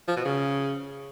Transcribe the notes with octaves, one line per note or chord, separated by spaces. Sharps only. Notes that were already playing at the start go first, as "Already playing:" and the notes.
F3
B2
C#3